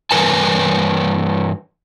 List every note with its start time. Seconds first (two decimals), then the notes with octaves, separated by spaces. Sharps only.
0.11 G2 E3 A#4 B4 G#5 A5